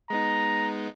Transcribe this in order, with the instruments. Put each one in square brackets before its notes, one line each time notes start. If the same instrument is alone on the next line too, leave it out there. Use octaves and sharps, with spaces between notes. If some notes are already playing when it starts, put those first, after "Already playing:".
[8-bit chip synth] G#3 B3 D#4 [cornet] A#5